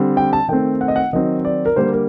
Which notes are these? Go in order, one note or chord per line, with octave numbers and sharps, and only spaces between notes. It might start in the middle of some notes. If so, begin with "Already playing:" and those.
Already playing: D3 G3 C4
G5
A5
D#3 A3 C4 G5
F#5
D#5
F#5
D#3 F#3 C4 D#5
D5
A#4
D3 G3 A#3 C5
A#4